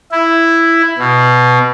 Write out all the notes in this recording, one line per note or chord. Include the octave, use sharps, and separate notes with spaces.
E4
B2